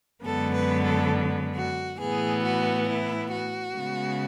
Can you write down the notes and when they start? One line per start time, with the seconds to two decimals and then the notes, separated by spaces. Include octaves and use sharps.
0.23 F#2 D3 G#3 B3 A4
0.54 B4
0.82 A4
1.55 F#4
1.99 A2 E3 B3 G#4
2.43 F#4
2.87 E4
3.30 F#4
3.75 C#3 G#3 B3